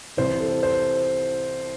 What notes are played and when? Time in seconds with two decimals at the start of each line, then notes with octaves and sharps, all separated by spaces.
0.17 C2 C3 E3 C5
0.40 A4
0.63 C5